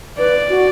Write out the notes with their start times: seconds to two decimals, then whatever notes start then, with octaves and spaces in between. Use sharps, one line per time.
0.18 B4 D5
0.50 F#4